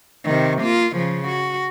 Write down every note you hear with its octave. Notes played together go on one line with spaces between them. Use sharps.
C3 D#3
A#3 F4
C#3 F3
F#4